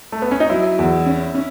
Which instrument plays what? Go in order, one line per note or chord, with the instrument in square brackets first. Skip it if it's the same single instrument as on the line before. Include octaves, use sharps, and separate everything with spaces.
[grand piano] A3
B3
C#4
D#4
[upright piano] F#3 [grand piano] E4
[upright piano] E2
C#4
C#4